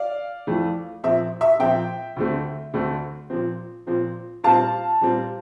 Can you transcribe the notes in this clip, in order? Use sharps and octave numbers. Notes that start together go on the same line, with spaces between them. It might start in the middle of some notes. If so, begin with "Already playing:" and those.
Already playing: D5 F5
F2 E3 A3
A#2 F3 C4 E5
E5
A#2 F3 C4 E5 G5
D2 D3 A3 C4
D2 D3 A3 C4
A#2 F3 C4
A#2 F3 C4
A#2 G3 C4 F5 A5
A#2 G3 C4